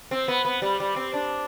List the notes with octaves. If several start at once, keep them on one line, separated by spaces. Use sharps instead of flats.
C4
B3
B3
G3
G3
C4
D4